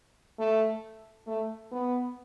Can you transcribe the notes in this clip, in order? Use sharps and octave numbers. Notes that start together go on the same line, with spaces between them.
A3
A3
B3